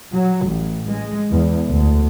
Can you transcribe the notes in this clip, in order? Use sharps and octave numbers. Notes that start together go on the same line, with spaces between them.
F#3
A1
G#3
E2
D2